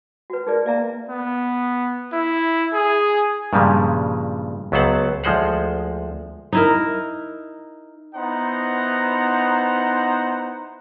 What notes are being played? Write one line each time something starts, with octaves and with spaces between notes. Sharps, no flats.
F#4 B4
D#4 G#4 A#4 D5
A#3 D5 E5 A#5
B3
E4
G#4
G2 A#2 C#3 F3 G3 G#3
C#2 F#3 B3 C5 F#5 A5
D2 F3 G#3 C5 F#5
D#4 E4 A#4
B3 D#4 E4 C5 F#5 A#5